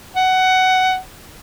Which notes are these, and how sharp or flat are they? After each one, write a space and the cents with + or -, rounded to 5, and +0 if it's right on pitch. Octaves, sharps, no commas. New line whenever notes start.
F#5 +15